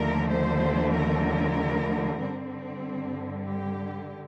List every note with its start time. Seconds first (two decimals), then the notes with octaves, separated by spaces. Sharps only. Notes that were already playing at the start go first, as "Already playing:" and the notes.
Already playing: D#2 D3 F3 A3 A#4
0.28 C5
0.93 A#4
2.18 G2 D3 G3 C4
3.46 G4